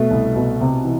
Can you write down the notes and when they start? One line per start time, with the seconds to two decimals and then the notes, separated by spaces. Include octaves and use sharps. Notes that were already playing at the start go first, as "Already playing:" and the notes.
Already playing: B2 A3
0.11 C2
0.36 B2
0.61 C3
0.85 E3